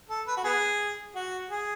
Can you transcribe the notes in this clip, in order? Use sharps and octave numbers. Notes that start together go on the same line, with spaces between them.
A4
B4
F#4
B3 G#4
F#4
G#4